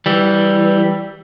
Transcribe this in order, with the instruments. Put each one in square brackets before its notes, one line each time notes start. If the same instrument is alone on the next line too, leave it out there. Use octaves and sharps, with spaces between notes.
[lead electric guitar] E3 G3